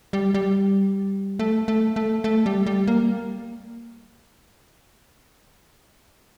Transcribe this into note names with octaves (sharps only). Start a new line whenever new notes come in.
G3
G3
A3
A3
A3
A3
G3
G3
A#3